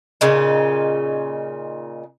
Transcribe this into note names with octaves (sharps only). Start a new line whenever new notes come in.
A#2 C#3 D#4